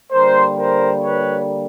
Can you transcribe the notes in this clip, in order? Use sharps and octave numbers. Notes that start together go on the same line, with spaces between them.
D3 G3 A#3 A#4 C5
A#4 C5
B4 C#5